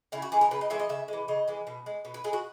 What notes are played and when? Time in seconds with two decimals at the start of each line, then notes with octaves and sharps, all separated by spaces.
0.12 C#3 E4
0.22 F#4
0.32 E3 G#3 G#4
0.41 A#4
0.51 C#3 B4
0.61 D#5
0.70 E3 G#3 E5
0.79 D#5
0.89 C#3 E5
1.08 E3 G#3
1.28 C#3 D#5
1.48 E3 G#3
1.67 B2
1.86 G#3
2.05 B2
2.14 B4
2.24 G#3 G#4
2.33 F#4